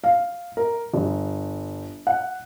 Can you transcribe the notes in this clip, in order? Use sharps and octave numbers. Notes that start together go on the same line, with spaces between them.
F5
A#4
G1
F#5